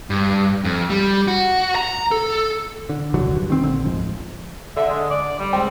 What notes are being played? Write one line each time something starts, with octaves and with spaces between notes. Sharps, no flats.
G2
F2
G3
F#4
A#5
A4
D3
D#1 C2 D3 F#3
G2
D#3 C4
A#1 D3 C4
D1 G#2 F3
D3 E5
G#3
D5
G3
C#2 C4